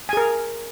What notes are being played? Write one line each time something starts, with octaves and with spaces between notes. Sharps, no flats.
G#4 A#4 G#5